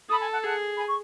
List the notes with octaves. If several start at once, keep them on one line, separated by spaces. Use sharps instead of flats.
A4 B5 D#6
G#5 B5
F#5 A5
G#4 F#5 A5
G#5 B5
C#6